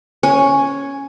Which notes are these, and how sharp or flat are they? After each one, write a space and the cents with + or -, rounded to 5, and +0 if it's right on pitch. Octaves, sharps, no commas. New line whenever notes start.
C#4 +0 C#5 +0